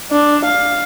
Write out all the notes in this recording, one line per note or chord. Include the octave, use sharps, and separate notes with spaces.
D4
F5